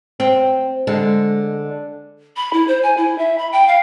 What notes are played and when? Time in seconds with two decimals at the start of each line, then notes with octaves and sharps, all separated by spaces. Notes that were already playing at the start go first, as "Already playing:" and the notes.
0.20 C4
0.87 D3 G#3
2.36 B5
2.53 E4
2.68 C5
2.83 G#5
2.97 E4
3.18 E5
3.38 B5
3.52 G5
3.67 F5